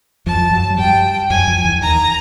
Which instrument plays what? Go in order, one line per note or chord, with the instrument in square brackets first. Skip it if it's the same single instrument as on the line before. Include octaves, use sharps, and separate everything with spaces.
[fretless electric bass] F2 F3 [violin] A5
[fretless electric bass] F3
F#2 F#3
F#3
[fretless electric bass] G2 G3 [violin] G5
[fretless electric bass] F#2 F#3 [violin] G#5
[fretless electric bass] F2 F3
E2 E3
[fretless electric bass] D#2 D#3 [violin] A#5